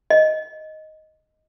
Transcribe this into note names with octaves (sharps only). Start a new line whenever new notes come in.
D#5